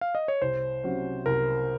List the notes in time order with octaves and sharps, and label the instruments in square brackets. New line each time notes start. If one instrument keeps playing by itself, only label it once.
[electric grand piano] F5
D#5
C#5
[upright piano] C2 [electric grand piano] C5
[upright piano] C3 F#3 C#4 F#4
[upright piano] C2 [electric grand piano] A#4